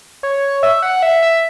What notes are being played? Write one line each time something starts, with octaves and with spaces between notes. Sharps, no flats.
C#5
E5
F#5
E5
E5